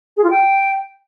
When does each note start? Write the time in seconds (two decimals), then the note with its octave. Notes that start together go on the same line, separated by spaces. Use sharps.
0.17 G#4
0.24 F4
0.30 G5